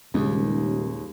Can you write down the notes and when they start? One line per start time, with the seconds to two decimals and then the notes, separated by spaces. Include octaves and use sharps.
0.14 D#1 D#2 C#3 G#3